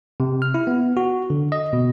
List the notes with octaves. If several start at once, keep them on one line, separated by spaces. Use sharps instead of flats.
C3
F6
E4
B3
F#4
D3
D#5
B2